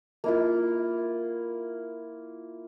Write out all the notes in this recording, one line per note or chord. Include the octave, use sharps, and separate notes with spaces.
A#3 E4 F4